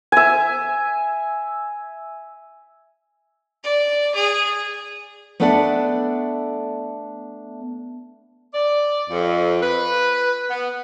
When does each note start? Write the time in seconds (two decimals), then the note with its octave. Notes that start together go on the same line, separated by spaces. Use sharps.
0.12 E5 G#5
3.64 D5
4.15 G#4
5.40 A3 B3 D4 A4 D5 F#5
8.54 D5
9.10 F2
9.62 B4
10.50 B3